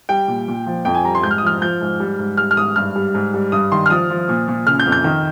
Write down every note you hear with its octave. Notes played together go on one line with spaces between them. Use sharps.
G3 G5
A#2
A#2
F3
F2 G5
G#5
G3 A#5
C6
G#2 G6
F6
D#6
F3 F6
F3 G6
G#2
G3
G#2
G3 F6
F6
G#2 D#6
G2 F6
G3
G#2
G3
G2 D#6
D#3 C6
F6
F3 D#6
F3
A#2
A#2
C#3 F6
G6
F2
G6
D#3